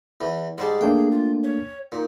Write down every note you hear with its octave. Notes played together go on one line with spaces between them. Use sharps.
E2 E3
G#2 G3 G#4 A5
A3 A#3 D4 G5
F4
C#5
A#2 D#4